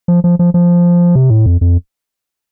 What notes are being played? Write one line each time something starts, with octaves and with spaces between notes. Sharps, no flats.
F3
F3
F3
F3
C3
A2
F2
F2